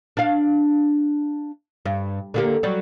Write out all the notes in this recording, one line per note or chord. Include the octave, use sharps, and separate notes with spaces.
D4 F5
G2
D3 A#3 G4
F#3 G3